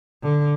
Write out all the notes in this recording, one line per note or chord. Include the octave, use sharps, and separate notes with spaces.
D3